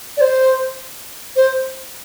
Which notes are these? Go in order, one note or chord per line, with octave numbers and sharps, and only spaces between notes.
D5
C5
C5